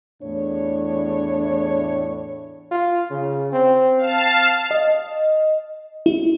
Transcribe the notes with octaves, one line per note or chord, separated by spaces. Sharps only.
E2 A2 D4 C#5
F4
C#3
C4
F5 A5
D#5
E4